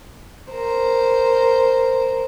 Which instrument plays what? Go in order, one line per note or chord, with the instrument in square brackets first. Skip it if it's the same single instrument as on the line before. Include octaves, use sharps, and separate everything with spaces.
[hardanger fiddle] A#4 C5